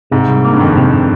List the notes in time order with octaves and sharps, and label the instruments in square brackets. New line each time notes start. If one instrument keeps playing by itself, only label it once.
[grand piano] G#2 [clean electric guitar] C3
[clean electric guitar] C2
A#3
[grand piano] G2
[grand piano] F2 [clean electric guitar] D#3
[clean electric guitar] C3